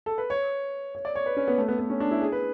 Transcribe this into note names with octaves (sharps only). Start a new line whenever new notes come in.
A4
B4
C#5
C#5
D5
C#5
B4
C#4
B3
A3
B3
B3
C#4
D4
E4
G#4
B4